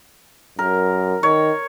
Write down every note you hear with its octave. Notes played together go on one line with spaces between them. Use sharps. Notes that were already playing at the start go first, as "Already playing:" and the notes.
F#2 A#4
D#3 C#5